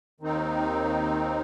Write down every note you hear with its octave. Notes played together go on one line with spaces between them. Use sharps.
D#2 D#3 C4 D#4